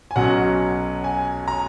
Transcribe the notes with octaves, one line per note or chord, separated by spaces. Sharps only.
G#5
B1 B2 F#3 C#4 F#5
G#5
A#5